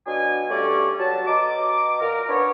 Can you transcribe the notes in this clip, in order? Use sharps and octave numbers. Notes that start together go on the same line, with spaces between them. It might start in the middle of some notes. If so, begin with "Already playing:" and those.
B2 F#3 D4 G#5
G2 G3 A3 C#4 C#5 D5
F#3 A5
B2 D#5 A#5 D6
A#2 A#4
B3 D4 B4 C#5